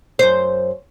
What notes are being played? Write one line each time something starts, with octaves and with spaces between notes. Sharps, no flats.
F#2 C5